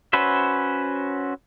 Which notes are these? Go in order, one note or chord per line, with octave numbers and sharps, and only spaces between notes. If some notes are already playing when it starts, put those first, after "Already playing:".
C#4 F#4 B4 C5 E5